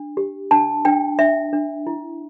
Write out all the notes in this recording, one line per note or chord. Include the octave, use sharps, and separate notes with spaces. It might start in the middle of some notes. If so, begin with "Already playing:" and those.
Already playing: D4
G4
D4 A5
D4 G5
D4 E5
D4
E4